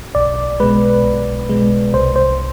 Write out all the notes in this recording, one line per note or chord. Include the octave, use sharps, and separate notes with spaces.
B1 D5
B2 G#3 B4
B1
B2 G#3
C2 C5
C5